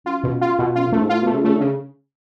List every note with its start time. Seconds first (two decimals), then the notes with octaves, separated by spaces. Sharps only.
0.06 F#2 F4
0.24 B2
0.41 F4
0.59 B2
0.75 F#2 F4
0.84 F2
0.92 F#2 A3
1.00 G#2
1.09 A2 F4
1.22 B2
1.26 A3
1.32 C#3
1.44 C#3 A3
1.55 D3
1.61 C#3